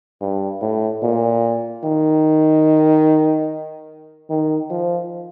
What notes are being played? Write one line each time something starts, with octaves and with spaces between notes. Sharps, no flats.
G2
A2
A#2
D#3
D#3
F3